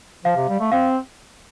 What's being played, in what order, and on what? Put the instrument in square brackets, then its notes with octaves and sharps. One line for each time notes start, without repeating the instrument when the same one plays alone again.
[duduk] F3 [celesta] F5
[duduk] C3
G3
A3
[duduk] C4 [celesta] F5